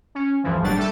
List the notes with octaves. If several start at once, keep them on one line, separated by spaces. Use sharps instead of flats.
C#4
D2 G2 E3 F3
G#1 A#2 F#3 G3 D4 A6
G3 A3 A4